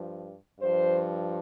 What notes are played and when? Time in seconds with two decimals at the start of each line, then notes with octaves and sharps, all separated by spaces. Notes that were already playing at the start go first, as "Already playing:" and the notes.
Already playing: G2 F3
0.60 G2 F3 C5